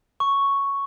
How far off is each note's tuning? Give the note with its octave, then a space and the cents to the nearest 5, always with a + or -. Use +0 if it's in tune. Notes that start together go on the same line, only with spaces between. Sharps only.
C#6 +0